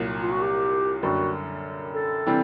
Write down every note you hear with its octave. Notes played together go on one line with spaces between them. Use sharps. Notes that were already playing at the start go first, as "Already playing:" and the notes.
Already playing: C2 A#2 F#3
F4
F#4
G4
F#2 D3 G3 A#3 F#4
A4
C3 E3 G3 C4